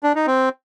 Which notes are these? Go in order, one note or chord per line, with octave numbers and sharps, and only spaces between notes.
D4
D#4
C4